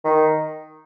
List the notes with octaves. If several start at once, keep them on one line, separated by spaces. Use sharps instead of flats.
D#3